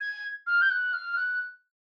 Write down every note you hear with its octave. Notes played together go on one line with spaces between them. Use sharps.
G#6
F6
G6
F#6
F6
F#6